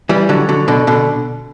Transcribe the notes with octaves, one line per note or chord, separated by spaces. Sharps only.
E3 G3
D3 F#3
D3 F#3
B2 D3
B2 D3